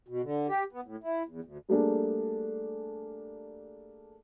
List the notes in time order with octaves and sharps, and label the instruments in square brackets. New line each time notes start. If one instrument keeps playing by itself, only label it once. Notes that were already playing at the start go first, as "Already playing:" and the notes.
[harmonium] B2
D3
G4
B3
A2
E4
E2
D2
[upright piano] G3 A3 A#3 D4 G#4